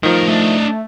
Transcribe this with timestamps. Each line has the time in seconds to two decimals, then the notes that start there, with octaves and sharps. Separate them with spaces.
0.03 A2 D#3 F3 A#4
0.28 A3 D4 D#5